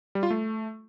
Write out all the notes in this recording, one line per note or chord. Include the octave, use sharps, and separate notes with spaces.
G3
F4
A3